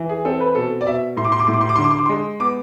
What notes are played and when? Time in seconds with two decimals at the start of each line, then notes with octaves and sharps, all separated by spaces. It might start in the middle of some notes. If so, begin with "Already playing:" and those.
Already playing: E3
0.09 G#4
0.25 C4 A4
0.40 B4
0.55 B2 A4
0.81 D5
0.87 B2 E5
1.17 A2 C6
1.25 D6
1.32 C6
1.40 D6
1.47 A2 C6
1.54 D6
1.61 C6
1.69 D6
1.76 C6
1.78 D3
1.84 D6
1.91 C6
1.99 D6
2.06 G#3 C6
2.40 B3 D6